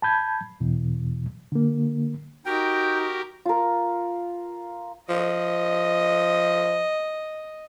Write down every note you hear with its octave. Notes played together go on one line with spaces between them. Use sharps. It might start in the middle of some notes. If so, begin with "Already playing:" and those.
A5 B5 G6 G#6
E2 B2 E3
D3 A#3
D#4 F#4 G4 A#4 G5
F4 A#4
F3 D#5